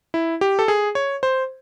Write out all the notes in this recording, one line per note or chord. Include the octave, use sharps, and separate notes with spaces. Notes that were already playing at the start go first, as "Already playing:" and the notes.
E4
G4
A4
G#4
C#5
C5